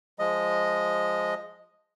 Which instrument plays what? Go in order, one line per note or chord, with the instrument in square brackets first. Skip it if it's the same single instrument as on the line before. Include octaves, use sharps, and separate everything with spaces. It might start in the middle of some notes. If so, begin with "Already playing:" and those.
[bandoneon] F3 G#3 D#5